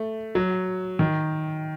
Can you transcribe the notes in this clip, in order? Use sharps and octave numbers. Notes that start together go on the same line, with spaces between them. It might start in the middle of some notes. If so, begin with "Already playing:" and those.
Already playing: A3
F#3
D#3